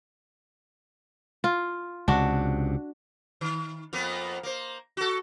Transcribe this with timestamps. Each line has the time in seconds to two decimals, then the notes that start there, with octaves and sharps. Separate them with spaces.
1.44 F4
2.08 C#2 C3 D4 F#4
3.41 D#3
3.93 F2 A#3 B3
4.43 A#3 C5
4.97 F#4 A4